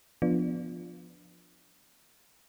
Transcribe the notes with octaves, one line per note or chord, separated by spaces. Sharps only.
F3 B3 D4 F4